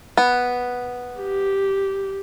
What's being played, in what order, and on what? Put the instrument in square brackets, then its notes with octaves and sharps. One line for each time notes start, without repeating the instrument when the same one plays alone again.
[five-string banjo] B3
[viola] G4